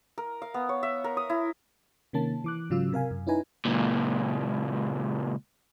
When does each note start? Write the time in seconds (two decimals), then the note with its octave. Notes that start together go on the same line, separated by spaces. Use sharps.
0.18 A#4
0.42 F5
0.54 B3
0.69 C#5
0.83 E5
1.04 A#4
1.17 D#6
1.30 E4
2.13 C3 D#3 A#3 C#4 A5
2.44 E3 D6 F#6
2.70 G#2 C#3 F#3 F4 E6
2.93 C3 A#4 F5 G#5
3.11 F#2
3.27 C#4 D#4 E4 B4 G#5 A#5
3.65 C#2 A#2